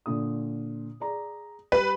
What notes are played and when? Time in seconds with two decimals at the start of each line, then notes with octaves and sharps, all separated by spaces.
0.06 A#2 D3 D#6
1.00 G#4 D5 A#5
1.72 G3 B4